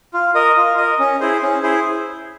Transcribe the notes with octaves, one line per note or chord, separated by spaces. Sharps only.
F4
A#4 D#5
F4
A#4 D#5
C#4
E4 G#4 C5
C#4
E4 G#4 C5